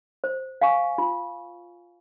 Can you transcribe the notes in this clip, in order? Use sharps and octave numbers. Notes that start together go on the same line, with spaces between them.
C5
F5 G#5 C#6
F4